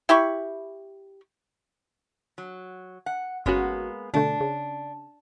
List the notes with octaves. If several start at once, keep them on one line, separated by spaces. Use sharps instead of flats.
E4 G4 B5 C#6
F#3
F#5
G1 G#3 A#3 B3 C#4 F#4
B2 D3 A3 D4
C#3